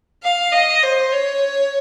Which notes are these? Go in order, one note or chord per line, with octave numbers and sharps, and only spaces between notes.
F5
D#5
C5
C#5